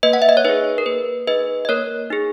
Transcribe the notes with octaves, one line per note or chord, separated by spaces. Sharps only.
A#3 B4 D#5
F#5
E5
D#5
C#5
D#4 G#4 B4
A#4
A#3 B4
D#4 G#4 B4 D#5
D#5
A#3 A#4 C#5
D#4 G#4